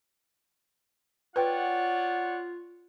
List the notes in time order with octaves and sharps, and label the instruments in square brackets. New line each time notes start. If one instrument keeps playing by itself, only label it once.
[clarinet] F4 [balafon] B4 G5 [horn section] C#5 D5 F#5